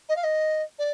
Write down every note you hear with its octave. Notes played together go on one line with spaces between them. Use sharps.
D#5
F5
D#5
D5